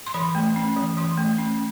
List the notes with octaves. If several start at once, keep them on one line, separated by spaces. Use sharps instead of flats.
C6
E3 B5
A3
C#4
E3
E3 C6
A3
C#4